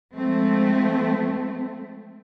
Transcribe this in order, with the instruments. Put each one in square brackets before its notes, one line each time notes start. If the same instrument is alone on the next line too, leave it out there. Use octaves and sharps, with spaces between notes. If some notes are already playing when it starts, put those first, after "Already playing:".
[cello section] F3 G#3 A3 C4